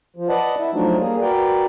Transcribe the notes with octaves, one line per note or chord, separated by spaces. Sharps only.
F3
B4 D5 D#5 F#5 A5
E4 E5
F3 F#3 A3 D4 D#4 F#4
G3 A#3 G#4
F#4 A#4 B4 D5 G5